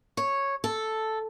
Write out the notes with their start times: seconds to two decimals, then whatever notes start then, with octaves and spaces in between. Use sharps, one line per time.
0.17 C#5
0.64 A4